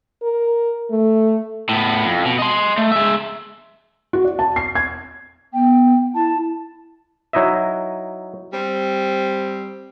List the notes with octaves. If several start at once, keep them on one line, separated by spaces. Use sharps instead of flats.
A#4
A3
A2 B3
F2
B2
D#5 C6
A3
G#3 E5
F#4
D5
A5
C7
G#6
B3 G5
E4 A5
F#3 D#4 E4 D#5 E5
G3 C4